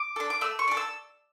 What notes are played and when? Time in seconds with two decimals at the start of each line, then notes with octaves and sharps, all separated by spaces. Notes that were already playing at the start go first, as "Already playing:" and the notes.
Already playing: D6
0.16 D4 A4
0.30 D6
0.41 A3 E6
0.59 C#6
0.68 D4 A4
0.77 E6